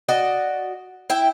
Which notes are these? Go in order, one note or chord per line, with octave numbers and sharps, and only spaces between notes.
F#4 D5 D#5
E4 E5 G5